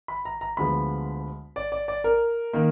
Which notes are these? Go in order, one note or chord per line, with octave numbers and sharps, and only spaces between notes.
B5
A#5
A#5
D2 D3 F3 G#3 B3 B5
D5
D5
D5
A#4
D#3 A#3